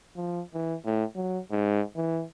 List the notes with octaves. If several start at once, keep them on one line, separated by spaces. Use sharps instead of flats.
F3
E3
A2
F#3
G#2
E3